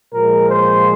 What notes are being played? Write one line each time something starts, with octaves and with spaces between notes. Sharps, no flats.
A#2 F3 G#3 A#4
C5